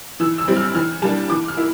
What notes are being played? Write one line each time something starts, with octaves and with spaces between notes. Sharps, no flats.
E3 E6
E6
G3 C4 E4
F6
E3 F6
G3 A#3 D4 A5
E3 D6
F6
A#3 E4